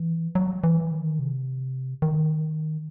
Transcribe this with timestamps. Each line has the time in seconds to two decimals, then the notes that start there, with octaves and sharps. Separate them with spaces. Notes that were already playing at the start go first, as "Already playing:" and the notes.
Already playing: E3
0.35 F#3
0.64 E3
0.92 D#3
1.19 C3
2.02 D#3